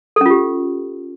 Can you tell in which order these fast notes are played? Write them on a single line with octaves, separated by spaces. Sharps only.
A4 C#4 F4 G4